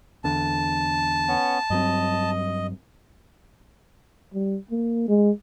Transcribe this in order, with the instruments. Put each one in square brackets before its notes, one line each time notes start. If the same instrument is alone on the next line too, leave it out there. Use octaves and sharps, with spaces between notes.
[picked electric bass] E2 D3 [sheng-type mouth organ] A5
[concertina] B3 C#4
[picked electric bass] G2 F#3 C4 [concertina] D#5
[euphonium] G3
A#3
G#3